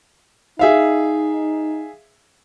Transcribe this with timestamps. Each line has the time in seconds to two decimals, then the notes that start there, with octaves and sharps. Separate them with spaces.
0.59 D#4 G#4 E5 F5